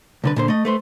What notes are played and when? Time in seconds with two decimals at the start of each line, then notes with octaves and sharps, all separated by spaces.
0.24 C2 D3 B4
0.36 A#2 D3 C5
0.48 A3 D#5
0.65 A3 B4 C5